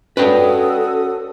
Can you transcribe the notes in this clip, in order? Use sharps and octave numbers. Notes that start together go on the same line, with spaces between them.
C#4 F#4 A4 B4 D5 G5 D#6